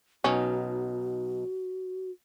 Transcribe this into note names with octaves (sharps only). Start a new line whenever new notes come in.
B1 B2 C#4 D#4 F#4